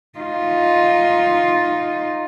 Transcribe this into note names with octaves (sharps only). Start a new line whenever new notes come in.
D#4 F4